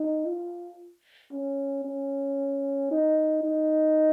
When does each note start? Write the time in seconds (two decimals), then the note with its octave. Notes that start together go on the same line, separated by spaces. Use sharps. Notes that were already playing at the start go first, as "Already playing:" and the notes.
Already playing: D#4
0.26 F4
1.32 C#4
1.85 C#4
2.91 D#4
3.44 D#4